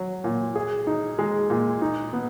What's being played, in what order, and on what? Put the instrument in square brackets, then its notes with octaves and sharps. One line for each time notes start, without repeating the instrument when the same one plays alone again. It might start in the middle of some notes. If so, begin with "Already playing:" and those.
Already playing: [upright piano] F#3
A#2
G#4
D#4
G#3
A#2
D#4
B3